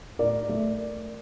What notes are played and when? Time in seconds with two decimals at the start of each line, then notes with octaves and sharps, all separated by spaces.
0.19 A2 A#4 D5
0.49 A3